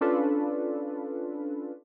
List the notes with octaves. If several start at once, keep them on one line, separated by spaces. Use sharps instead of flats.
C#4 D4 F4 A4 B4